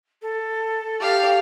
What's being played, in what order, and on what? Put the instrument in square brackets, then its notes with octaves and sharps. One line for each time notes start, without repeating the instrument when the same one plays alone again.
[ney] A4
[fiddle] G4 F5